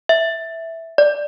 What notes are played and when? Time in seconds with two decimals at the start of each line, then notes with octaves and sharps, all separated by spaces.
0.09 E5
0.98 D5